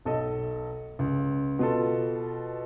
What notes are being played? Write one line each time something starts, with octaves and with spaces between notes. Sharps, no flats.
B1 A4 D#5
C#2
B2 F4 A4